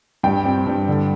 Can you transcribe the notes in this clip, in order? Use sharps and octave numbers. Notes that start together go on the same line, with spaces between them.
G2 G5
C4
G2
D3